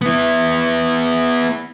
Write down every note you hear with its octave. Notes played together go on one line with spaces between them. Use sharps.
B3 E4